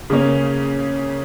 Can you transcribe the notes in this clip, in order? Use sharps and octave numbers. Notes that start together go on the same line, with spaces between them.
C#3 A#3 C#4